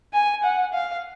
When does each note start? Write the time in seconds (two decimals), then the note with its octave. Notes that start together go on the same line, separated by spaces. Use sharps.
0.13 G#5
0.43 F#5
0.73 F5